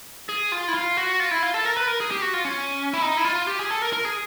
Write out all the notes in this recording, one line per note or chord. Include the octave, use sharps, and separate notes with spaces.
G#4
F4
E4
F4
F#4
F4
E4
F4
A4
A#4
B4
A#4
G#4
G4
F#4
F4
C#4
E4
D#4
E4
F4
G4
G#4
A4
A#4
A#4
G#4